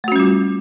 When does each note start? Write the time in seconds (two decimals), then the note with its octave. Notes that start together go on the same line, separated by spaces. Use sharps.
0.04 A3
0.08 F#4
0.12 C#4
0.16 G3
0.20 F4